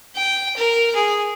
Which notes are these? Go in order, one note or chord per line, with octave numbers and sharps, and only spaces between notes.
G5
A#4
G#4